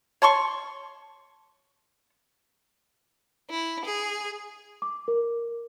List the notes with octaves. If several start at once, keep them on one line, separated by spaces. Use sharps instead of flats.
C#5 A5 C6 C#6
E4
G#4
D6
A#4